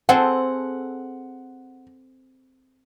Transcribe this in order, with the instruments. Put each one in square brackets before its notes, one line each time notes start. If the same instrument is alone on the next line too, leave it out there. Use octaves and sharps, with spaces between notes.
[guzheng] C4 G#4 A4 [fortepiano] F#5